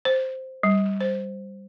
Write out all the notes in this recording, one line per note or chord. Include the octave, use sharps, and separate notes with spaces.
C5
G3
C5